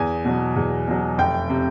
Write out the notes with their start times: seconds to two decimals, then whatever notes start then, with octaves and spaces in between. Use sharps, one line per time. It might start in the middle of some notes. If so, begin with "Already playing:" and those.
Already playing: E2 G#5
0.25 B2 F#3
0.56 E2
0.88 B2 F#3
1.18 F1 G5
1.50 C3